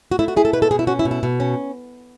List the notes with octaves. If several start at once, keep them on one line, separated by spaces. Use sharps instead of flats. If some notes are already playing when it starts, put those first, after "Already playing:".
F#4
A3 E4
F#4
E4 G#4
A4
B2 B4
A4
B2 G#4
E4
C#4 F#4
E4
B2
E4
B2
C#4